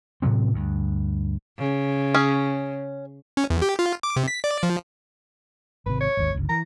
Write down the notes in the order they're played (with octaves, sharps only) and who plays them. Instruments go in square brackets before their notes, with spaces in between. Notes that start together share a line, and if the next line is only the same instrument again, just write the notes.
[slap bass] A2 C3 F#3 C4
D2 G2
[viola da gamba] C#3
[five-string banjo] C#4 G#4
[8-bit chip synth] C#4
E2
G4
F4
D6
C3
B6
D5
F3
[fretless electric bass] G#1 C3 [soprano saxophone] B4
[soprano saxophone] C#5
[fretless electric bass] G#1 D#2
G1 C#2
[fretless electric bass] E3 [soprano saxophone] A#5